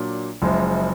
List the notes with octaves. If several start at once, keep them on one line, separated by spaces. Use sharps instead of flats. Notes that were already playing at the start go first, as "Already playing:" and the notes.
Already playing: A#2 F#3 D4
F#1 F#2 F3 G#3